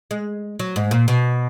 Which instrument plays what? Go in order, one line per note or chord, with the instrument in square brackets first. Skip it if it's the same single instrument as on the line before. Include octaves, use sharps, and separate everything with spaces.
[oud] G#3
F#3
G#2
A#2
B2